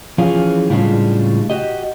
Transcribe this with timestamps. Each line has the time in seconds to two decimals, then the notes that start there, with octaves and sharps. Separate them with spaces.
0.18 E3 F3 C#4 F4 G#4
0.70 A2 C#3 G3 G#3 D4 F4
1.50 F#4 G4 D#5